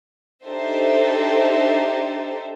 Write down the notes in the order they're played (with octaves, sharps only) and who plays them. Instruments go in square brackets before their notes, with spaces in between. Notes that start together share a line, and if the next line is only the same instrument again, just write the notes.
[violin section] D4 D#4 G4 A4 C5 E5